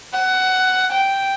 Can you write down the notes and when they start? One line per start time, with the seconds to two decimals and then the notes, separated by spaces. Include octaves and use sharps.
0.14 F#5
0.92 G5